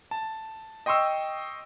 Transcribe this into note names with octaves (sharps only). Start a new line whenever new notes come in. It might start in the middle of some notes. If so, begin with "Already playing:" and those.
A5
D#5 G5 C6 C#6 E6